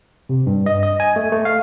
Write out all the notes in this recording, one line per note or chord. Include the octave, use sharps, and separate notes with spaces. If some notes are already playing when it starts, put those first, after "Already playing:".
C3
G2
D#5
D#5
G#5
A3
A3
F5